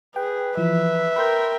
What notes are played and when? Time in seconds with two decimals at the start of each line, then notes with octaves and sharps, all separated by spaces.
0.16 G#4 B4 G5
0.57 E3 F3 E5
1.16 A#4 G5 B5 C6 G6